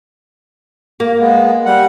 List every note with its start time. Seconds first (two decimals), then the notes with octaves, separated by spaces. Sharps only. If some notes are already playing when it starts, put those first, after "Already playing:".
1.00 A#3
1.20 G#3 B3
1.66 G3 F#5